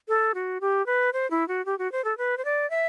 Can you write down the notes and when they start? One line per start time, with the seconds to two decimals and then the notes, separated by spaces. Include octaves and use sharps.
0.08 A4
0.35 F#4
0.61 G4
0.86 B4
1.13 C5
1.31 E4
1.48 F#4
1.66 G4
1.79 F#4
1.92 C5
2.05 A4
2.18 B4
2.37 C5
2.45 D5
2.70 E5